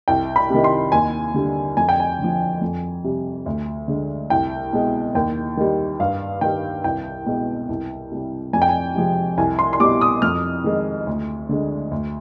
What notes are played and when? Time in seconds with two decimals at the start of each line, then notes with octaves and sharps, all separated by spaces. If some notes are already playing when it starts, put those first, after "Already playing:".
0.08 C2 G5
0.36 B5
0.50 C3 D#3
0.64 C6
0.92 D#2 G#5
1.34 D3 G3
1.77 F2 G#5
1.89 G5
2.00 G#5
2.19 D3 F3
2.61 F2
3.04 C3 G3
3.46 D2
3.88 D3 G#3
4.30 C2 G5
4.73 B2 G#3
5.15 D#2 G5
5.57 D#3 G3
6.00 G2 F5
6.41 D#3 G3 G5
6.84 C2 G5
7.26 B2 G#3
7.69 C2
8.12 C3 G3
8.53 F2 G#5
8.62 G5
8.69 G#5
8.95 C3 F3 G#3
9.38 C2 G#5
9.59 C6
9.73 C6
9.80 B2 G3 D6
10.01 D#6
10.22 F2 F6
10.64 D#3 G#3
11.07 D2
11.49 D3 G#3
11.91 D2